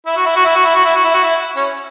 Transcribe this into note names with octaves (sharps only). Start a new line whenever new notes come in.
E4
F#4
E4
F#4
E4
F#4
E4
F#4
E4
F#4
E4
F#4
E4
C#4